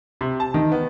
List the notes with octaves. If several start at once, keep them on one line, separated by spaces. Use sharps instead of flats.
C3
A5
D#3
B3